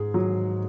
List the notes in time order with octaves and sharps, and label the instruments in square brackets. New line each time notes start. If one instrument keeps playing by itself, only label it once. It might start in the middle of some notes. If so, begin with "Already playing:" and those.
Already playing: [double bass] G#2 [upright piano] G#4
[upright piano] F#3